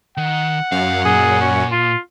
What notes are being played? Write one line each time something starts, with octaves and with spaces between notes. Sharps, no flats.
D#3 F#5
F#2 F5
A#2 G#4
C#4
F4